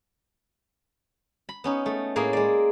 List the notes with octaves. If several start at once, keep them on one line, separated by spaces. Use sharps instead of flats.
B5
B3 C#4 D#4
A3
A2 A#3 G#4 G#5
G#3 D5